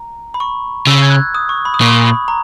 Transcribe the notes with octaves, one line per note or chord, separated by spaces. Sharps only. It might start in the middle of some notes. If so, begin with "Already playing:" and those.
Already playing: A#5
B5
C#6
C#3 E6
G#6
F#6
D#6
C#6
B5
D#6
A#2 C#6
B5
A#5